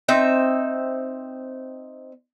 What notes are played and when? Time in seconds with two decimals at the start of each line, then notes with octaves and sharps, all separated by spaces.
0.09 C4 D#4 E5